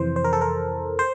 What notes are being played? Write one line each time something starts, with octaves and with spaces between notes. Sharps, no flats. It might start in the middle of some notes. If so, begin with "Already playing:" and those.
Already playing: F2 C3 E3 C5
C5
A#4
A4
A#4
C5